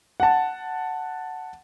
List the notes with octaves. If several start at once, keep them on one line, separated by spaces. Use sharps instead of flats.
F#5 A5